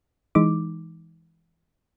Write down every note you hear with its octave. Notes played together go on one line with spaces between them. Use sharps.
E3 G#3 D#4 D6